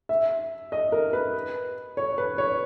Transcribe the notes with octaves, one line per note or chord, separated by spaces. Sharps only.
E5
D#5
A#4
B4
C#5
B4
C#5